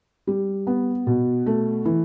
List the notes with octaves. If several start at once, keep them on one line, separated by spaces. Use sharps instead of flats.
G3
B3
B2
A3
E3